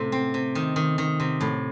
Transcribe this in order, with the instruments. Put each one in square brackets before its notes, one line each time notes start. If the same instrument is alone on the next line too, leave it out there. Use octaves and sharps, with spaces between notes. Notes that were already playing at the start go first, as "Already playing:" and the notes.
Already playing: [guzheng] A2 C3 A3
C4
C3
D#3
D#3
D#3
C3
A2